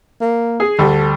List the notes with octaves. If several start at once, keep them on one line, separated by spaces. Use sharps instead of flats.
A#3
G#4
D2 G3 A4